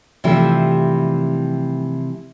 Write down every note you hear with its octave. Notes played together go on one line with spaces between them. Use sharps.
C3 E3 F3 G3 A3 E4